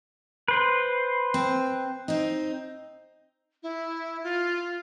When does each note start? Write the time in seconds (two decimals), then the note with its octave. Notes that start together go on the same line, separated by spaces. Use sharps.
0.48 B4 C5
1.34 C4
2.08 C4 D#4
3.63 E4
4.24 F4